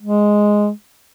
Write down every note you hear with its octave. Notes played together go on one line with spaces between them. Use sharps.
G#3